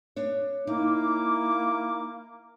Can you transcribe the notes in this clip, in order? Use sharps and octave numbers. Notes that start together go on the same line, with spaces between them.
D4 C#5
A#3 D#4 E4 D6